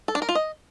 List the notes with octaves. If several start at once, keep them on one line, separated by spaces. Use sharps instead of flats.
A4
D4
A#4
F4
D#5